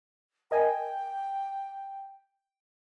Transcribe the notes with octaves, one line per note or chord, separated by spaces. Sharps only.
A#4 D#5 G5 G#5